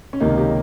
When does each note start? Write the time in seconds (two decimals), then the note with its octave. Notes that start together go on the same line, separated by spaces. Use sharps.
0.13 C#4
0.20 C#2 C3 D#3 A#3 D#4
0.38 D#4 G4